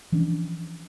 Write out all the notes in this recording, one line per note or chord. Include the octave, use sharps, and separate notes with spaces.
E3 F3 C#4 D4